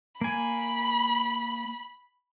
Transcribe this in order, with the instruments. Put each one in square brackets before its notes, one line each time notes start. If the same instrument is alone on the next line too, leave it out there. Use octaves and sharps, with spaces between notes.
[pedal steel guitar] A#3 G#5 [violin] B5